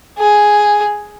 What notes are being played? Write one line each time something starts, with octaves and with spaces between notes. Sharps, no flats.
G#4